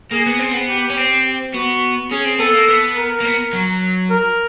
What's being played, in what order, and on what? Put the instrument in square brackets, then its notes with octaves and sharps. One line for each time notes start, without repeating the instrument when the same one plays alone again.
[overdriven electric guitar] A#3 [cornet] G#4
[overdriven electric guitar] B3
C4
B3
[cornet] G4
[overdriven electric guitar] C#4
C4
[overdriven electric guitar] B3 [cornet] F#4
[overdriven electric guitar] C#4 [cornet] G#4
[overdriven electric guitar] C4
[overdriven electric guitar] B3 [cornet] A4
[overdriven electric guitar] A#3
B3
[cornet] A#4
[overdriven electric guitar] A#3
B3
F#3
[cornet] A#4